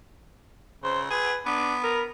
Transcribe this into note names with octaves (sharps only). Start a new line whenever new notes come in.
C#3 C5
G#4 B4
B3 D4
A#4